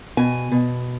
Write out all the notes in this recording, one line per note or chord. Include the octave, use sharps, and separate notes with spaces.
B2 G#5
B2